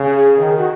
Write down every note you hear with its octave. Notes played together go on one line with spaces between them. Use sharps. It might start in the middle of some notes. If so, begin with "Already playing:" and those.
Already playing: C#3
G#4
D#3
F#4